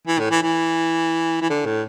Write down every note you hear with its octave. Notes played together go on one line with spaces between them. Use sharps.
E3
A2
E3
E3
E3
D3
A2